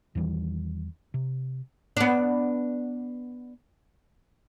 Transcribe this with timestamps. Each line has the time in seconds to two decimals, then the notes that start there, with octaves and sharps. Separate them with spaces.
0.15 E2 D#3 E3 G3
1.14 C3
1.97 B3 D4